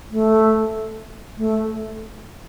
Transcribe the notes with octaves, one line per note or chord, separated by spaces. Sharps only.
A3
A3